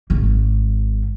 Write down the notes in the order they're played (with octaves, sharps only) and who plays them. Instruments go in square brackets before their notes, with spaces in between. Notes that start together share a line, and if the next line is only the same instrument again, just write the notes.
[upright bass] G#1 G#2